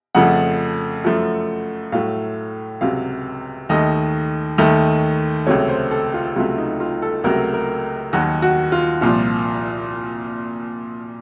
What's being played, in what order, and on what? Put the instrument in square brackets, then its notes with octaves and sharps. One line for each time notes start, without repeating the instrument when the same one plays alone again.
[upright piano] F2 C#3 F3 A3 F#5
F#2 F3 A3
A2 F#3 A3 F5
C#2 C3 F#3 F5
D#2 D#3 A3 D#5
D#2 D#3 A3
C#2 C3 F#3 A3 C#5
C5
A4
F4
C#2 C3 F#3 A3 F4
D#4
F4
A4
C#2 C3 F#3 A3 A#4
A#4
D#2 D#3 F#3 F#4
F#4
F4
C2 A#2 F3 F4